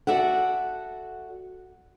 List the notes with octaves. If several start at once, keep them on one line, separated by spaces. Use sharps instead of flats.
F#4 A4 D5 E5 F#5